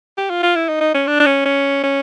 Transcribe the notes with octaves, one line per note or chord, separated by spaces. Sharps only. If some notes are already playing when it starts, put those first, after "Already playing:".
G4
F4
F4
E4
D#4
D#4
C#4
D4
D4
C#4
C#4
C#4